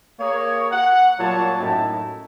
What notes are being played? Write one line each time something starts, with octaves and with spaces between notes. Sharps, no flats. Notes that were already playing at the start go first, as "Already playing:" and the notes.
A#3 G#4 A#4 C#5
F#5
A#2 F#3 G3 A#3 C#5 A5
F#2 A2 D#4 E4 A5